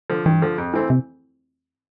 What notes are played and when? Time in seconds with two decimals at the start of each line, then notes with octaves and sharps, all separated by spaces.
0.10 D3 F3
0.26 G2 E3
0.42 D3 F3
0.58 F2
0.74 E3 A3 C4 E4
0.90 C3